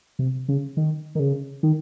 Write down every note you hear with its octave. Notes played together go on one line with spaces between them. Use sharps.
C3
C#3
D#3
D#3
C#3
D#3